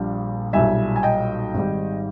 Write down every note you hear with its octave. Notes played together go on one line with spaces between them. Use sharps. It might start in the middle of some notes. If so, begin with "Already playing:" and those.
Already playing: A#1 A#2 G3
B1 A#2 G3 E5 G#5
G#5
D#5 G5
G#1 G#2 G3